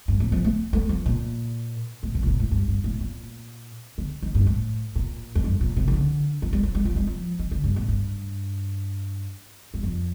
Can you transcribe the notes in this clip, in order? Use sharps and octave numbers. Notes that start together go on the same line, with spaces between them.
G2
A2
F3
A3
A3
F3
A#2
A2
C3
A2
A#2
A2
G2
G2
A2
A#2
D3
D#3
G2
A2
A#2
F2
G2
A#2
C3
D#3
D3
F3
G3
F3
G3
F3
G3
F3
D#3
D3
G2
A2
G2
G2
F2